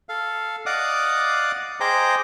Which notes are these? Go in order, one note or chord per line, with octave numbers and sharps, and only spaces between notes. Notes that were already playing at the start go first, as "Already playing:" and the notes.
A4 F5
D5 D#5 F5 F#5 D6 D#6
G#4 C5 D#5 G5 A#5 D6